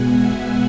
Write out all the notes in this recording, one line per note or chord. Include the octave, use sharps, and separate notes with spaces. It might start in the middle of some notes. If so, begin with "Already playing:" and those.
Already playing: B2 G#3 B3 F#5 G#5
E5